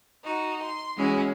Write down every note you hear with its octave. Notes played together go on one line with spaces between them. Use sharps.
D#4 F#4
C6
E3 G#3 C#4 E4 F#4 G#4